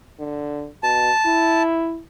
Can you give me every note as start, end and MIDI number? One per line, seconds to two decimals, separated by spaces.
0.19 0.68 50
0.83 1.10 47
0.83 1.63 81
1.26 2.00 64